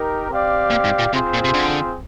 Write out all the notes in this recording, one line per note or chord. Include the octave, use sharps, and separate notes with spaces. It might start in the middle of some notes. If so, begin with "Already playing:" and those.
Already playing: D#4 G4 A#4
C4 G4 D5 F5
A#2
G#2
A#2
C3 C4 F4 G#4 C5
A#2
C3
D3